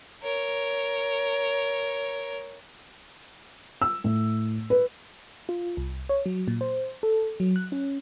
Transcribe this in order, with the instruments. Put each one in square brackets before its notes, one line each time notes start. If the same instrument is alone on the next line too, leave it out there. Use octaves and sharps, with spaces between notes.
[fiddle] A#4 C#5
[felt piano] E6
A2
B4
[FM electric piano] F4
C2
C#5
F#3
A#2
C5
A4
F#3
F#6
C#4